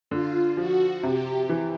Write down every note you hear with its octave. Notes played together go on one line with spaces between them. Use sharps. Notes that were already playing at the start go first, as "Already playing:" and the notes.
D3 F4
F3 F#4
C3 G4
E3